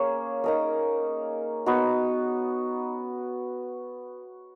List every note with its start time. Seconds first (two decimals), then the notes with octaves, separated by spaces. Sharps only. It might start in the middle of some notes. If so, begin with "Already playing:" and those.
Already playing: A#3 C#4 G#4 C#5
0.44 D#4 A#4 D#5
1.66 B3 D#4 F#4